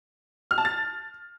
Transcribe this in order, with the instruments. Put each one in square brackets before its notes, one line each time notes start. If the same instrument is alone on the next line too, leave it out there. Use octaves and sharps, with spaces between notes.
[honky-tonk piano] F6
A5
A6